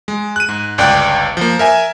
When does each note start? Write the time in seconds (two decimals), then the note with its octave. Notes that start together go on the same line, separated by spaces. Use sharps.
0.08 G#3
0.36 F#6 D#7
0.49 G#2
0.78 G1 C#2 D5 G5 D6 F#6
1.37 F3 A#3
1.59 A#4 E5 G#5